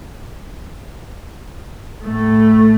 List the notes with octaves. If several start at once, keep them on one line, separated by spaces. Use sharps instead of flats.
A2 A3